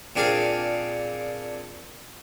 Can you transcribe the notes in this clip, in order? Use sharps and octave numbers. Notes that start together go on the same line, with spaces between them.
A#2 C4 D4 G#4 F5